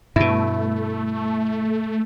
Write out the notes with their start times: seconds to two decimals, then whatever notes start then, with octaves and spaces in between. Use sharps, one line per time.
0.16 G2 B2 A3 E4